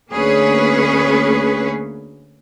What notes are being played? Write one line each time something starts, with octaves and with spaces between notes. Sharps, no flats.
D2 A#3 C#4 G#4 B4 C#5